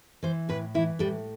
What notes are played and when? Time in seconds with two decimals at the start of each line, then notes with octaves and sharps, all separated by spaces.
0.23 E3 C5
0.49 A2 B4
0.74 E3 E4
0.99 A2 G3